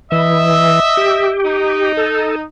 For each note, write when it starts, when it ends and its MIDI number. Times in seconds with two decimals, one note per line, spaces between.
0.12 0.80 52
0.12 1.33 75
0.12 1.33 76
0.97 1.92 67
1.45 2.44 63
1.97 2.36 69